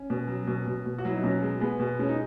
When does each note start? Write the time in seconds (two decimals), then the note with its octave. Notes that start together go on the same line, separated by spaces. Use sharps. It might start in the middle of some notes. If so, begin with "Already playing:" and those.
Already playing: C#4
0.10 B2
0.28 F#3
0.47 B2
0.66 B2
0.86 B2
0.98 F#4
1.05 F#3 E4
1.16 D#4
1.23 B2 C#4
1.42 G#3
1.61 G#3 B3
1.80 B2
1.99 G#3 C#4
2.09 D#4